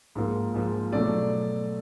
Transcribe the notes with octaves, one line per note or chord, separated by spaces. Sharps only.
G#2 F3 A#3
G#2 F3 A#3
B2 F#3 A3 D5